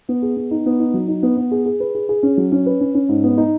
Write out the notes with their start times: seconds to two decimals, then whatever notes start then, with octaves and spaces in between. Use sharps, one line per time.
0.09 B3
0.22 G#4
0.36 B3
0.51 D#4
0.66 B3
0.80 D#4
0.94 F#3
1.08 D#4
1.23 B3
1.37 B3
1.51 G#4
1.65 G#4
1.80 B4
1.95 G#4
2.09 G#4
2.23 C#4
2.37 F#3
2.52 C#4
2.66 B4
2.81 C#4
2.95 C#4
3.09 G#2
3.24 B3
3.38 D#4